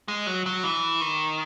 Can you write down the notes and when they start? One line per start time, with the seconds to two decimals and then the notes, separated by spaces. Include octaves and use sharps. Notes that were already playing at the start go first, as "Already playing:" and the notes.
0.08 G#3
0.27 F#3
0.46 F#3
0.64 E3
1.01 D#3